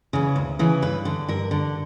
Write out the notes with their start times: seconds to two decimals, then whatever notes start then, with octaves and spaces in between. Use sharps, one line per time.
0.13 C#3 E3
0.36 D2
0.59 C#3 E3
0.82 G2 B4
1.05 D3
1.28 G2 A#4
1.51 D3